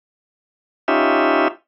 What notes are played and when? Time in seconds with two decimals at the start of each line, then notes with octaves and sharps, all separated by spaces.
0.88 C#4 D#4 F4 G4 E5